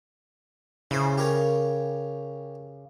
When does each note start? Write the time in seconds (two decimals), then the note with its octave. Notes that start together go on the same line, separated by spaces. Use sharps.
0.91 C#3 E4 C5
1.18 G4 A#4 C#5